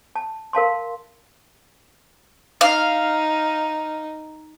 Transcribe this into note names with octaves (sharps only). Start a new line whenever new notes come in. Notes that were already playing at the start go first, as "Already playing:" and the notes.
A5
A#4 F5 A5 C6
D#4 F5